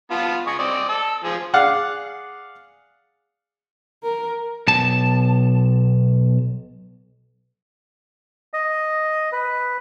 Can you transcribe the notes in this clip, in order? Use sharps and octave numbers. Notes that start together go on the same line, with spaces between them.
B3 F4 A5
G#4 D#5 C#6
C4 D5 D#5
A4 E6
F3 G#4
G#4 D5 F5 F#5 F#6
A#4
B1 A5
D#5
B4